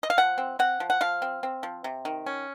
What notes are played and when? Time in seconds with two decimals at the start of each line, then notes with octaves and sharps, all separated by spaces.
0.03 D#5
0.10 F5
0.18 F3 F#5
0.38 C4
0.59 C4 F#5
0.80 F3
0.90 F#5
1.01 F3 F5
1.22 C4
1.43 C4
1.63 F3
1.84 C3
2.05 D#3
2.26 C#4